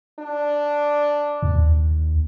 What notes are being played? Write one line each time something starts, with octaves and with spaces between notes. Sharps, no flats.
D4
D#2